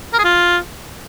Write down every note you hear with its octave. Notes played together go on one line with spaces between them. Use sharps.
A#4
G#4
F4